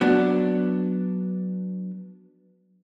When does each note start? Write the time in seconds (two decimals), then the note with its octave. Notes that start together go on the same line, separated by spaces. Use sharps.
0.01 F#3 B3 D4